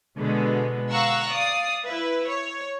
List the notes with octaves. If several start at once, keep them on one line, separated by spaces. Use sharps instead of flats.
B2 D3 G#3 B3
F5 F#5 A#5 C#6 E6 F#6
D5 F5 D#6
E4 B4 E5
C#5